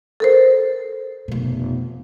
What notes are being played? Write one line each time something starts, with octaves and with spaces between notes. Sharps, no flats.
A4 A#4 C5
F1 B2